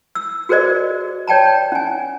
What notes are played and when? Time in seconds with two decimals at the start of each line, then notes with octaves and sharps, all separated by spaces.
0.15 E6
0.49 F#4 G#4 A#4 C5 D5 D#5
1.27 C#5 D5 G5 A5 A#5
1.72 C#4 G#5